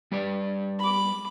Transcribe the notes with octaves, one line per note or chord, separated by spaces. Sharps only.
G3 B4 D5
B5 D6